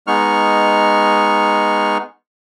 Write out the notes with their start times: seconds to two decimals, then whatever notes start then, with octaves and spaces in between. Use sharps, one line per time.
0.07 G#3 B3 D#4 C#6 F6